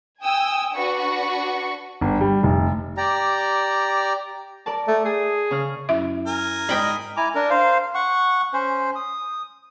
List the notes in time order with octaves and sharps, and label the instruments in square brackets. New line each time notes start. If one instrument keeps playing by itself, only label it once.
[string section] G5 G#5 D#6 E6
D4 F#4 B4 C#6
[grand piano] G1
G3
F1
[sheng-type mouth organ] G4 D5 A#5
[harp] A#4 D5 A5
[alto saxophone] A3
[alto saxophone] G#4 [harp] D#6
[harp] C#3 F6
[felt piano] F#2 E4 [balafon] E5
[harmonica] A#4 G#5
[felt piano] G#2 B6 [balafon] D5 [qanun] D#5 G5 B5
[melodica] E4 G#5 A#5 D6
D4 A#4
C5 F5
F#5 C#6
C#4 C5
D#6